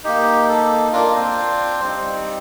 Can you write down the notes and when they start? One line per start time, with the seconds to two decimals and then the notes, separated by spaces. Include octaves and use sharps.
0.04 A#3 D#4 G4
0.48 A4
0.93 A#3 D4 F4 A#4
1.15 C4 C5
1.82 G3 C4 D#4